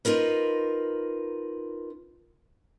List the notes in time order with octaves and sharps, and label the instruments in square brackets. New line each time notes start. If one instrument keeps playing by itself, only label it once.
[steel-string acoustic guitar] D#4 F4 A#4 B4